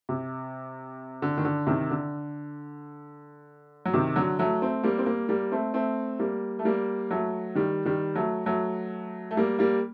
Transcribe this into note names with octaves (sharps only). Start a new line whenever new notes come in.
C3
D3
D#3
D3
C3 D#3
D3
F#3
C3 D#3
D3 F#3
F#3 A3
A3 C4
G3 A#3
C4
G3 A#3
G3 A#3
A3 C4
A3 C4
G3 A#3
A3
G3 A#3
F#3 A3
D#3 G3
D#3 G3
F#3 A3
F#3 A3
A3
G3 A#3
G3 A#3